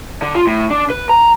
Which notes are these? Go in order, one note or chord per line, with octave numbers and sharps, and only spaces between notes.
D3
F4
A2
D4
B4
A#5